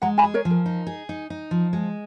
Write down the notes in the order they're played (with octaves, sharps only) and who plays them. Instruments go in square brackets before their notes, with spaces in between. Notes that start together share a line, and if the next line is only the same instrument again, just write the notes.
[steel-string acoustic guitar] G#3 [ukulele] F#5 A#5
[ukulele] G#5 B5
[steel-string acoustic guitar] G#4
[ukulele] A#4 C#5
[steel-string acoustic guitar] F3
[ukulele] A#4
[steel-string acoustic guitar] D#4
G#4
D#4
D#4
F3
G#3